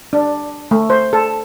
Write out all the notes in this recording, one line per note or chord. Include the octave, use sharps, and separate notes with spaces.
D4
A3
C5
A4